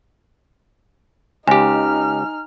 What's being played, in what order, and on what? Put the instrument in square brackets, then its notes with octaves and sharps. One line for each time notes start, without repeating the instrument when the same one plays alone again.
[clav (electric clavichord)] C#2 G4 [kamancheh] D#4 F6 [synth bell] G#5